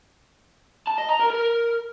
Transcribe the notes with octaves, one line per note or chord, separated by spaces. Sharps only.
A5
D#5
A#5
A#4
A#4